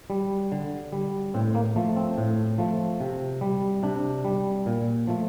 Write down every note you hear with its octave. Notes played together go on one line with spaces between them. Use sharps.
G3
D3
G3
A2 C4
A#3
F3 A3
C4
A2
F3 A3
C3
G3
C3 D4
G3
A#2
F3 A3